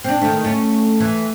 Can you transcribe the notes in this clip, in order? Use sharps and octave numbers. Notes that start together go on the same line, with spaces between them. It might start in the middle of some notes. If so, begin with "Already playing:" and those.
C4 D4
D#3 A3
A3 C#4
E3